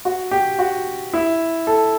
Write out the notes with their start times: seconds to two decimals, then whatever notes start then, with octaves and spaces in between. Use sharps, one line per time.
0.05 F#4
0.31 G4
0.59 F#4
1.13 E4
1.67 A4